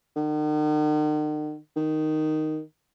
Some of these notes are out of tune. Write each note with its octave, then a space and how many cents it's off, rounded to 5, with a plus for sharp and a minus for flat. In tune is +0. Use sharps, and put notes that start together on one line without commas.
D#3 -45
D#3 -5